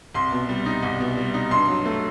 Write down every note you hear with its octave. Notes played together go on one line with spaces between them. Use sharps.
C2 C6
B2
G3
D#4
C2
B2
G3
D#4
G2 C6
F#3
A3